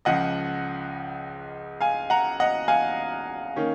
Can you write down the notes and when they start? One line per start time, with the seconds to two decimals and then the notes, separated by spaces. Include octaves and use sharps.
0.05 C#2 C#3 F3 D#5 F#5
1.81 F5 G#5
2.10 F#5 A#5
2.40 D#5 F#5
2.68 F5 G#5
3.56 D#3 A#3 C#4